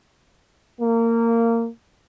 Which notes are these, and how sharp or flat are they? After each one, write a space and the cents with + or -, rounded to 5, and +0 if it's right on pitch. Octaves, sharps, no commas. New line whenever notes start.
A#3 -20